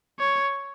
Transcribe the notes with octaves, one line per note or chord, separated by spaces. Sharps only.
C#5